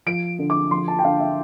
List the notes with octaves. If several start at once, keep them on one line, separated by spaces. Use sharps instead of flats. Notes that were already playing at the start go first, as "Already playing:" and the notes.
F3 D7
D3
D6
F3 C6
A5
G5
D3 F5
E5